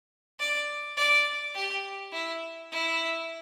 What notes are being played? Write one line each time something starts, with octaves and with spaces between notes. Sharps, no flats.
D5
D5
G4
E4
E4